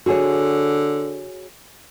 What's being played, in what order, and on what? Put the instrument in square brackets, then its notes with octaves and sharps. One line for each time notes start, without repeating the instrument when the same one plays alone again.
[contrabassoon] D3 [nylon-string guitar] F#4 G#4 C#5